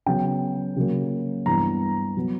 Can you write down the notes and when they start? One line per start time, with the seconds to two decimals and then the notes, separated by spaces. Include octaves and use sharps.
0.06 C#3 F#3 B3 G5
0.76 C#3 F#3 A#3
1.46 G2 E3 B3 A#5
2.17 F#3 B3